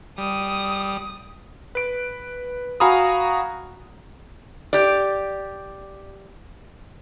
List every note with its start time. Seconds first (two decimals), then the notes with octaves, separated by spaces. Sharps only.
0.18 G3 D#6
1.75 B4 D7
2.80 F#4 F5 G#5 A#5 B5 D#6
4.73 G4 D5